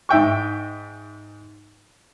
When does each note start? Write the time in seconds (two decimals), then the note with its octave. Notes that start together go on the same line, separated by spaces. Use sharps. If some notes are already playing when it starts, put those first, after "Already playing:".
0.09 G#2 E5 G5 C#6